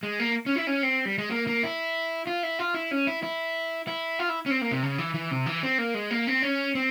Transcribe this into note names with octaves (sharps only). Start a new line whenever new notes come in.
G#3
A#3
C#4
E4
C#4
C4
G3
G#3
A#3
A#3
E4
F4
E4
F4
E4
C#4
E4
E4
E4
F4
E4
C#4
C4
A#3
C3
C#3
E3
E3
C3
E3
C4
A#3
G#3
A#3
C4
C#4
C4